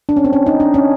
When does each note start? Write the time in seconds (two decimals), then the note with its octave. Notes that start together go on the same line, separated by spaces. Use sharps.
0.09 D4
0.17 C#4
0.24 C4
0.33 C#4
0.46 D#4
0.60 D4
0.74 C#4